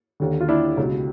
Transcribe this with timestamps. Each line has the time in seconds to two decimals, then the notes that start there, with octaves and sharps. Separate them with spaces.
0.20 D#2 D3
0.41 F4
0.48 D4 E4
0.77 C#2 B2